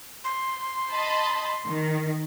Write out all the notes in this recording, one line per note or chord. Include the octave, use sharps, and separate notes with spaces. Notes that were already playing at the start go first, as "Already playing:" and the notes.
C6
D#5 A5 B5
D#3